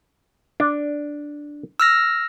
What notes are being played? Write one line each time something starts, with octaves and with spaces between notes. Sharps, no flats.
D4
E6 F6 A#6